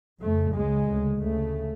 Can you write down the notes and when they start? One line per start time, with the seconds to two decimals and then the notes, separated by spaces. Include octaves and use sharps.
0.21 F2 C#3 A3
0.54 C#2 C#3 G#3
0.88 D2 C#3
1.20 D2 C#3 A3